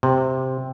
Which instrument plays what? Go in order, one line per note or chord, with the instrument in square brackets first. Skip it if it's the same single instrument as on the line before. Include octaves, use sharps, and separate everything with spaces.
[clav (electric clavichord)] C3